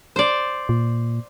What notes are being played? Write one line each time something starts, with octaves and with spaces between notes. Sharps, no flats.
C5 D5
A#2